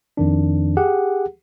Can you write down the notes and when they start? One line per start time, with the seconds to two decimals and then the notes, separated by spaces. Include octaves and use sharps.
0.17 F2 D#3 D4
0.77 G4 G#4 F#5